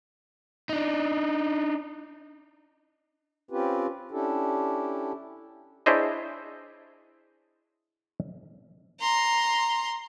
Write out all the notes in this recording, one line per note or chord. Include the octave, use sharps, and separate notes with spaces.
D4 D#4
C4 C#4 F4 G4 B4
C#4 D4 E4 G4 A4
D4 E4 G#4 C5 C#5 D#5
A#5 C6